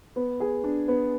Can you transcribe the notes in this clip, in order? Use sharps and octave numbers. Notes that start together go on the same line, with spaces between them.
B3
G#4
D4
B3